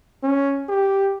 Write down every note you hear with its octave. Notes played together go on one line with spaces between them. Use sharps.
C#4
G4